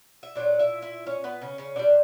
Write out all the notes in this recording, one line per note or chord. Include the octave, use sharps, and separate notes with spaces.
E5
A#2 F#3 D4 D5
E4 E5
E4 E5
C#4 C#5
B3 B4
C#3 C#4
C#3 C#4
A#2 D3 G3 D4